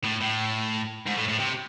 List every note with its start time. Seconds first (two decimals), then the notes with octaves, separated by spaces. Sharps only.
0.04 A2
0.21 A2
1.06 G#2
1.17 A2
1.29 A2
1.40 C3